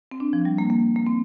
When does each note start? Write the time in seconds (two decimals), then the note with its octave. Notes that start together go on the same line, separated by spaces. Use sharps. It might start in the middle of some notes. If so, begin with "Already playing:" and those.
0.11 C4
0.20 D4
0.33 F3
0.45 G3
0.58 A#3
0.70 A#3
0.96 A#3
1.07 C4